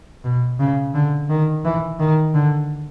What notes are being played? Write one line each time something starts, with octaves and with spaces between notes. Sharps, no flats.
B2
C#3
D3
D#3
E3
D#3
D3